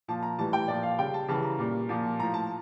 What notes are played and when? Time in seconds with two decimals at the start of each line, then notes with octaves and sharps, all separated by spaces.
0.08 A#2 F3 A5
0.23 A#5
0.38 A2 E3 G3 A5
0.53 G5
0.68 A#2 F3 D5
0.83 F5
0.99 C#3 G3 G5
1.14 A5
1.28 C#3 E3 G3 A5
1.44 A#5
1.59 A#2 G3
1.89 A#2 F3
2.19 A2 F3 A#5
2.34 A5